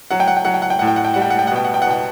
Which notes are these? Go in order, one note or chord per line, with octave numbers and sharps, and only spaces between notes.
F#3 F#5
G5
F#5
G5
F#3 F#5
G5
F#5
G5
A2 F#5
G5
F#5
G5
G3 F#5
G5
F#5
G5
F#5
B2 G5
F#5
G5
F#5
B2 G5